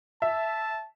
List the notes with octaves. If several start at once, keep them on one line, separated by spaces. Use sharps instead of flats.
E5 A5